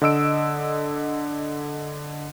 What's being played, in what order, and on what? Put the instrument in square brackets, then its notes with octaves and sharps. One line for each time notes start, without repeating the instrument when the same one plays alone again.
[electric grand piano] D3 D#5 E6 D7